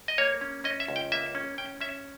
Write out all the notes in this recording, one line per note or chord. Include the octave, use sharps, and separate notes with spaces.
D#5
A#3 C#5
C#4
C#4 D#5
E5
C#2
G5
A#3 E5
C#4
C#4 G5
C#4 E5